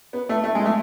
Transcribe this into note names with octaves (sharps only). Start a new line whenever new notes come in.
B3
A3
A3
G#3
A3